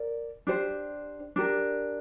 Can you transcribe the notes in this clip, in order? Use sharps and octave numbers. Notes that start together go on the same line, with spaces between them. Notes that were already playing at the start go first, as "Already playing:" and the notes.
Already playing: A#4 D5
D4 G4 C5
D4 G4 A#4